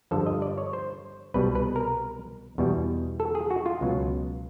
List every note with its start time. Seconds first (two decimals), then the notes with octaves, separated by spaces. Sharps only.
0.11 G2 D3 F3 A4
0.26 D#5
0.42 D5
0.58 C#5
0.73 C5
1.34 C2 B2 G3 B4
1.55 B4
1.76 A#4
2.58 E2 B2 G3
3.20 A4
3.35 G#4
3.51 F#4
3.66 F4
3.81 C#2 B2 F#3